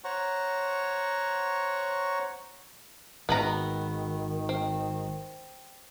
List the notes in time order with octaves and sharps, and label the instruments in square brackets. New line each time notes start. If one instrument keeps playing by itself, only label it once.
[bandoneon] C5 C#5 F#5 A#5 C#6
[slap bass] G#1 [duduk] D#3 [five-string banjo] B3 B4 A#5
[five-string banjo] C4